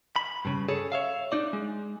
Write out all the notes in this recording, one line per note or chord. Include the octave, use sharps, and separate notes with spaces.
B5
G2 C#3
G#4 A4 C#5
C#5 E5 F5
D4 D#4 D5
G#3